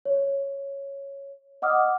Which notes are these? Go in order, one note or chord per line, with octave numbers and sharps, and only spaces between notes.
C#5
D#5 F#5 D6 D#6 F6